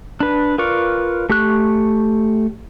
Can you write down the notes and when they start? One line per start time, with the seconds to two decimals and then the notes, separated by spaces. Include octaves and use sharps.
0.20 D4 B4
0.58 F4 A#4 B4 D5 C#6
1.29 A3 G4 C#6 F#6